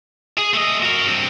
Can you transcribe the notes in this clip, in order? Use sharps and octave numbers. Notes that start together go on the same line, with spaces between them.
G#4
A3 D#5
F#4 A#4
G2 C4